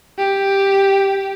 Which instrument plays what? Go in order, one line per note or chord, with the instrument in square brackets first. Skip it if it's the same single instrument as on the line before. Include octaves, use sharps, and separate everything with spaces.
[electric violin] G4